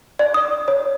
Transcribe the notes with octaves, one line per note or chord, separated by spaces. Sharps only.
D5
D#6
C#5